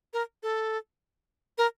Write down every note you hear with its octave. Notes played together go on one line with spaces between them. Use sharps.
A#4
A4
A#4